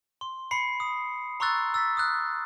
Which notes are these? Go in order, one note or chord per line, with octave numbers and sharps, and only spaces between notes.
C6
B5 C7 C#7
D#6
A#5 C6 C#6 E6 F#6 A6
E6 A6 B6
D#6 F6 F#6